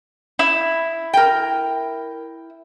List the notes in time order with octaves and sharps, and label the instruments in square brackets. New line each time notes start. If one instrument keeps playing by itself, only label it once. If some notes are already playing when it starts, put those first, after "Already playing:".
[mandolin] E4
[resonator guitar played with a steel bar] A#4 G5